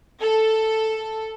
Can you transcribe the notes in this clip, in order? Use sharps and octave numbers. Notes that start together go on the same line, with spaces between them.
A4